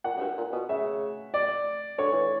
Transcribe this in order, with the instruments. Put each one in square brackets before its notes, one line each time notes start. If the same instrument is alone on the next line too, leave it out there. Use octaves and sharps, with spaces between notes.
[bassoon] A#2 [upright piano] F#5
[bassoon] F#2
G2
A#2
B2
[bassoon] C#3 [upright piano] E5
[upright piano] D5
[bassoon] D3 [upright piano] C#5
[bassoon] E3